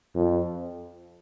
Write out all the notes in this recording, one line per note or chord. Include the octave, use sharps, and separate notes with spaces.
F2